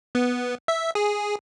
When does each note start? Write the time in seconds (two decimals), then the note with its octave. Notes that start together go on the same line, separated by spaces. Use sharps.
0.15 B3
0.68 E5
0.95 G#4